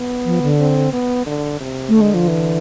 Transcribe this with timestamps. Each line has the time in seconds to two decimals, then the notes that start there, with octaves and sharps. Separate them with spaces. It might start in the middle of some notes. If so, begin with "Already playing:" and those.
Already playing: B3
0.25 F3
0.42 D3
0.59 C4
0.92 B3
1.26 D3
1.60 C3
1.88 A3
1.94 D3
2.01 G#3
2.14 F3
2.28 E3